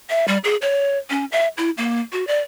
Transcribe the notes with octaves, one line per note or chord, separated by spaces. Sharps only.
E5
G3
G#4
C#5
C#4
E5
E4
A#3
F#4
D5